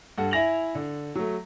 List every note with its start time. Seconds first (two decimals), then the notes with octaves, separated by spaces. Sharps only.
0.18 G2 A4 F#5
0.31 E4 E5 G#5 A#6 F7 F#7
0.75 D3
1.15 F#3 A3